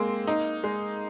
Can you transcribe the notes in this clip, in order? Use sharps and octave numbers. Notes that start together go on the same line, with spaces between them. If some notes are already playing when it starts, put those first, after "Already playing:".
Already playing: G#3 A#3 C4
D#4
G#3